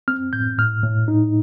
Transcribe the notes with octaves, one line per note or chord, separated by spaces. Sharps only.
C4 F6
A2 G6
A2 F6
A2
D#4